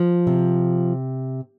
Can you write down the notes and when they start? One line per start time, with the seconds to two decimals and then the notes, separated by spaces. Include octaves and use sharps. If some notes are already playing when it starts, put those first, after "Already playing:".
Already playing: F3
0.27 C3